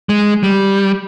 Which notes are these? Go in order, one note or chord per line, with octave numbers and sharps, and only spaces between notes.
G#3
G3